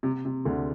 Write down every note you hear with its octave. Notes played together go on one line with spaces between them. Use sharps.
C3
C3
D2 D3